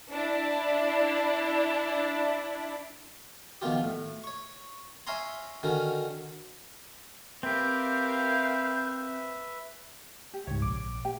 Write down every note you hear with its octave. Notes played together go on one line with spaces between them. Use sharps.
D4 E4
B1 B2 D#3 F3 F4 G4
A2
C#5 C#6
C#5 E5 F5 G#5 A#5 C6
D3 D#3 C#4 F#4 A#4
C4 G4 A#4 B4 E5 F5 G6
G4
C#2 G#2 C#5
A#1 D6
G4 G5